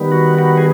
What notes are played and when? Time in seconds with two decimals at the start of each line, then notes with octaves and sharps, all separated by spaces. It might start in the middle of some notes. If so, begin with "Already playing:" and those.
Already playing: D#3 G3 B3
0.12 F#4
0.39 F#4
0.58 G#4